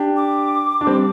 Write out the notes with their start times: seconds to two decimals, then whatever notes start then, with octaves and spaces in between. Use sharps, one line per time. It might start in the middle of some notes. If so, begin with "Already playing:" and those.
Already playing: D4 G4
0.16 D6
0.81 D4
0.87 G3 C4